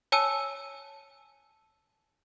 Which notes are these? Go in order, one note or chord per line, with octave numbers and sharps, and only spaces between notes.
C#5 G#5 A5 E6 D#7